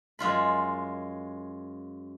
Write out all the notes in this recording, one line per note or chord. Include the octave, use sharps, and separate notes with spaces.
F#2 G#3 F4 B5